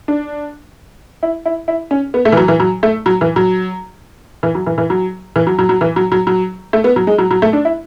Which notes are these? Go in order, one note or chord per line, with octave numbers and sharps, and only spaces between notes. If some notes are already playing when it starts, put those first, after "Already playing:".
D4
E4
E4
E4
C#4
B3
A3
E3
F#3
E3
F#3
A3
F#3
E3
F#3
E3
F#3
E3
E3
F#3
E3
F#3
F#3
F#3
E3
F#3
F#3
F#3
A3
B3
F#3
G#3
F#3
F#3
A3
D4
E4